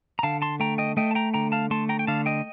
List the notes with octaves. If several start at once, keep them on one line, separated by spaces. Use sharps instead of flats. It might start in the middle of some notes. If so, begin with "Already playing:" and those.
A#5
D3 F5 A5
A5 C6
A3 G5 A#5
D#5 G5
A3 D#5 G5
A5
G5 A#5
D3 G5 A#5
F5 A5
A3 A5 C6
G5 A#5
G5
D3 F5 A5
D#5 G5